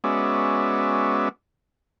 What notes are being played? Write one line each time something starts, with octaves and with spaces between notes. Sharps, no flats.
G#3 B3 C#4 F#4 D5 E5